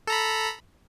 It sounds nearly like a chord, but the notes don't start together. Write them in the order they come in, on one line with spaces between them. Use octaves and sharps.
A4 A#5 B5